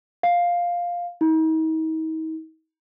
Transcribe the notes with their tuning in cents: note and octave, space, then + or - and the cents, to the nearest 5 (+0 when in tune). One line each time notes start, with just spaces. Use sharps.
F5 +5
D#4 +40